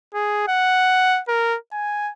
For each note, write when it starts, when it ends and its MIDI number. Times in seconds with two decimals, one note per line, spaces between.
0.15 0.48 68
0.48 1.21 78
1.28 1.57 70
1.72 2.12 80